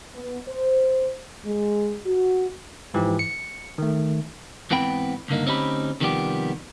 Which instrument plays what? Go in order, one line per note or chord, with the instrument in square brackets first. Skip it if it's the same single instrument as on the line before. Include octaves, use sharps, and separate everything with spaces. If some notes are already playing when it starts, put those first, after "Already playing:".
[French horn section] B3
C5
G#3
F#4
[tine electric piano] G#2 E3 F3 G4
C#7
D#3 A3
[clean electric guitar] G#2 E3 B3 C4 G5 B5
C#2 G2 D3 A#3 D#4
D2 C4 C#4 D#4 G4 B5
C3 D#3 F3 G3 B3 G4